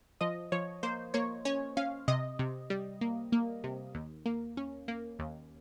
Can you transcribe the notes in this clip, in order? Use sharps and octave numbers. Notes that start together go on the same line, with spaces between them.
F3 D#5
F3 C#5
A#3 C5
A#3 C#5
C#4 C#5
C#4 F5
C3 D#5
C3
G3
A#3
A#3
C3
D#2
A#3
C#4
A#3
D#2